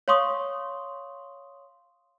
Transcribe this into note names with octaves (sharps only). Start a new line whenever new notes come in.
C#5 F5 C6 C#6 D#6